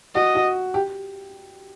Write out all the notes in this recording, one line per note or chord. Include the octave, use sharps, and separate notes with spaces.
F#4 D#5
F#4
G4